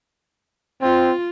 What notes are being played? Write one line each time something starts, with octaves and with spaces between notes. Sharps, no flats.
C4 F4